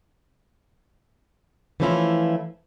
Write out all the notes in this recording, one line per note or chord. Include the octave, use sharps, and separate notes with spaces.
E3 F3 A3 C#4 E4 F4